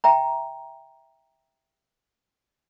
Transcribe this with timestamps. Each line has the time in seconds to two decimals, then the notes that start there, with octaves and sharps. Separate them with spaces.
0.04 E5 G5 A#5